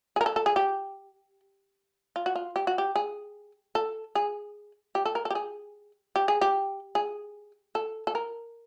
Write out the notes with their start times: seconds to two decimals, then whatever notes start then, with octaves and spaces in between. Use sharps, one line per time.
0.16 G#4
0.21 A#4
0.26 A4
0.36 A4
0.46 G#4
0.56 G4
2.16 F4
2.26 F#4
2.35 F4
2.56 G4
2.67 F#4
2.78 G4
2.96 G#4
3.75 A4
4.15 G#4
4.95 G4
5.05 A4
5.15 A#4
5.25 A4
5.31 G4
5.35 G#4
6.16 G4
6.28 G#4
6.41 G4
6.95 G#4
7.75 A4
8.07 A4
8.15 A#4